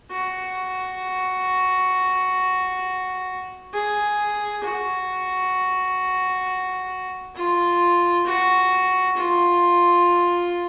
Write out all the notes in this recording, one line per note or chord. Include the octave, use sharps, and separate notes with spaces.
F#4
G#4
F#4
F4
F#4
F4